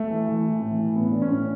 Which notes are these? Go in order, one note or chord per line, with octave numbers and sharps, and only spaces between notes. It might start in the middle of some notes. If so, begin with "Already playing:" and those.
Already playing: A3
E3
E3
E3
A2
E3
A2 B3
E3 D4
C#4
A2